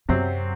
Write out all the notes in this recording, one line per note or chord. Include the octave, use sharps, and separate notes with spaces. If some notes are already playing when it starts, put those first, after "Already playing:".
F#2 C3 F#3 C4 F#4